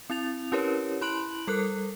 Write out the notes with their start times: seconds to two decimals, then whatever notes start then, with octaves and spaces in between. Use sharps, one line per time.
0.10 C4 E4 A6 F7
0.52 C#4 E4 G4 A#4 B4 C#5
1.01 E4 B5 C6 F#6 D7 F#7
1.47 G3 A4 A#4 F#6